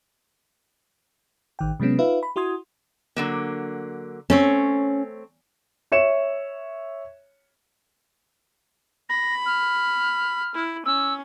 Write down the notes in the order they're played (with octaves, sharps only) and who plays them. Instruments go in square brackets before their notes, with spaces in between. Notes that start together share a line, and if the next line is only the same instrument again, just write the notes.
[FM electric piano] A1 D#3 G5
C3 F#3 G#3 B3 C#4
D#4 F4 B4 E5 F5
B5
E4 F#4 C6 D#6 G#6
[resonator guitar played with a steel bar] D3 F#3 A#3
[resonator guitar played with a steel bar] A3 C4 C#5 [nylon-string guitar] C#4
[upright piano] C#5 E5 C#7 E7
[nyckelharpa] B5 [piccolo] A#6
[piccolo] F6
[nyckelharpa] E4
[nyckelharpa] C#4 [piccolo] E6